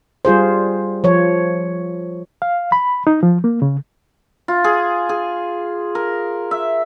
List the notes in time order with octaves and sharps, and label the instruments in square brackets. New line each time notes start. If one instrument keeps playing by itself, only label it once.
[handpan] G3 F4 G#4 C5
F3 C#5
[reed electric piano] F5
B5
D#4
F3
A#3
C#3
[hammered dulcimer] F4
G#4
G#4
A#4
E5